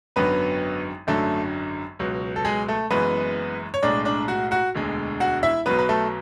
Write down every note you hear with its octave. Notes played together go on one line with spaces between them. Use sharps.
G#1 F#2 D3 F#3 B3 B4
G#1 F#2 D3 F#3 A3 A4
C#2 B2 F#3
A4
G#3 G#4
A3 A4
F#1 F#2 E3 G#3 B3 B4
C#5
B1 A2 G#3 D4 D5
D4 D5
F#4 F#5
F#4 F#5
E1 D2 D3 G#3
F#4 F#5
E4 E5
B1 B2 F#3 B3 B4
B4
A3 A4